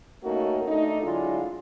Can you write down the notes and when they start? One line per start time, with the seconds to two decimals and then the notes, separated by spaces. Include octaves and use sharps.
0.24 A3 A#3 C#4 D#4 F#4 A#4
0.68 A3 D4 D#4
1.03 D3 F#3 G#3 D4 E4 F4